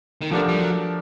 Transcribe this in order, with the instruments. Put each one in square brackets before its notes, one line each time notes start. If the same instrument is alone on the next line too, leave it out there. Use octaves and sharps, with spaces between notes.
[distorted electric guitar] D#3
[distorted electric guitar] D3 [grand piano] F3 A3 D4 G4 A#4
[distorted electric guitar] G3
F#3